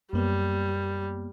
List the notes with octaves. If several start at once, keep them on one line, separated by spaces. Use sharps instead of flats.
F#2 G3 A#3 B3